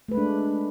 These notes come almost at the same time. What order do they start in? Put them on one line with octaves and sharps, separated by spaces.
A3 B4 G#3 D4